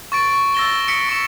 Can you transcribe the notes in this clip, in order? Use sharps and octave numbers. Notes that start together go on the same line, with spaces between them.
C#6 A6 D7
E6 A6 A#6 E7 G7
D#6 B6 C#7 D7
C#6 E7